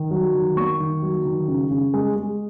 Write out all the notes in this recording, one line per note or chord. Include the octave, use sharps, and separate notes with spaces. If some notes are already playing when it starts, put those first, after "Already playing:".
Already playing: D#3
F#3
D#3
A#3 C#6
D#3
F#3
D#3
C#3
C#3
G#3
G#3